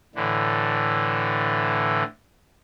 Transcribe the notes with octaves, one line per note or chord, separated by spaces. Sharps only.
A2 D3 E3